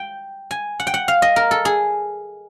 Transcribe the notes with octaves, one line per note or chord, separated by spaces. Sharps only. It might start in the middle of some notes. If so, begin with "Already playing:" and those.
Already playing: G5
G#5
F#5
G5
F#5
F5
D#5
A#4
A4
G#4